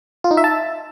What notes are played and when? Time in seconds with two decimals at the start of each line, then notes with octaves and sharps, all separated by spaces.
0.24 F4
0.31 D#4
0.37 E5
0.44 A5